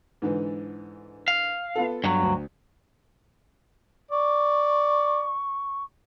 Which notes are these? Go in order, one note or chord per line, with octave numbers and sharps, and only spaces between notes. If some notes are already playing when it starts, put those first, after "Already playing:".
G#2 D3 E3
F5
B3 F4 A4
G2 F#3
D2
D5 C#6